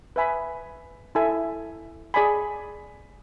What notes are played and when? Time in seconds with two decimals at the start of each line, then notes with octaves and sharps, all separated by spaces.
0.16 B4 E5 G#5 B5
1.15 E4 A4 E5 G#5
2.14 G#4 D5 G#5 B5